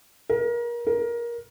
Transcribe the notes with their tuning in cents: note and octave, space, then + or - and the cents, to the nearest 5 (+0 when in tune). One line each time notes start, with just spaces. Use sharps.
A#4 +30
A#4 +20